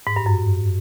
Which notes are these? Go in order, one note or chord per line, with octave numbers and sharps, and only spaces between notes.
G#2
G2
F#2